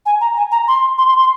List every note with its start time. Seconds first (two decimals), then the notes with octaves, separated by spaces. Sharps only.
0.06 G#5
0.21 A#5
0.36 G#5
0.51 A#5
0.68 C6
0.98 C6
1.08 C6
1.19 C6